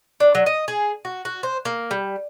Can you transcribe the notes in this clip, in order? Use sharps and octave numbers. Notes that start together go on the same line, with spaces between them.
D4
F#3
D#5
G#4
F#4
F#4
C5
A#3
G3